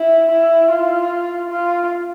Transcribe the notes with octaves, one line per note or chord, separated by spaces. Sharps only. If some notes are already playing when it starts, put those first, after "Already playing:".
Already playing: E4
E4
F4
F4